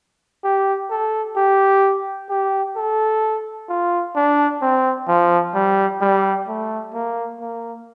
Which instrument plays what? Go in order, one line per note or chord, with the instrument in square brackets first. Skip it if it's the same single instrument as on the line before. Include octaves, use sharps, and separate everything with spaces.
[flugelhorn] G4
A4
G4
G4
A4
F4
D4
C4
F3
G3
G3
A3
A#3
A#3